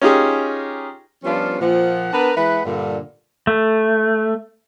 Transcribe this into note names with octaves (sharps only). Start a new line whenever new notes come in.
C#4 D#4 F4 G4 G#4
F3 G3 B3 C#4 D4 F4
A#2 F3 F#5
B3 D4 A#4 B4
E3 G#3 B4 E5 F#5
G2 A#2 D3
A3